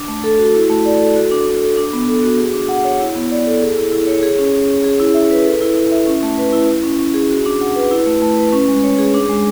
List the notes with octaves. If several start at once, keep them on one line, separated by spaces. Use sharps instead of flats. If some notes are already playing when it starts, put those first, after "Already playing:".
Already playing: D4
A3
A4
F#4
E4
A3
D5
A4
F#4
D4
D4
A4
D4
B3
A4
F#4
G#4
D4
F#5
C#5
E4
B3
D5
A4
G#4
E4
E4
C#5
G#4
C#4
C#4
C#5
G#4
E4
E5
B4
A4
E4
E4
E5
C#4
A3
B4
E4
E4
C#4
C#4
G#4
F#4
D4
F#5
B4
E4
A3
A3
B4
C#4
G#3
C#5
G#4
D4
G#3